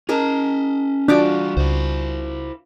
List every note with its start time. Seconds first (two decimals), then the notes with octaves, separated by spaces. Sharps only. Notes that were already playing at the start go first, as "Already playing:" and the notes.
0.09 C#4 G#4 A#4 D#5 A5
1.08 E3 G3 D4 F4 F#4 D6
1.57 C#2 E4 C5